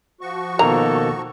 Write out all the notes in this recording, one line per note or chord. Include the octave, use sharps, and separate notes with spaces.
F3 F#4 C#6
B2 D#3 A#3 A4 A#5